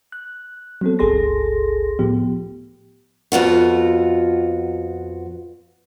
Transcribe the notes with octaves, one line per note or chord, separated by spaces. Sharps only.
F#6
F#3 B3 C4 A4
G1 C#2 G#4 A4 C6 A#6
A2 F3 B3 G4
F2 B3 F4 F#4